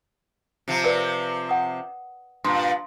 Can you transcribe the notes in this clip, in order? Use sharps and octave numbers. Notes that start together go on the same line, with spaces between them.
C3 F3
A#4 B4 D5
F#5 D#6
G2 A#2 C6 D#6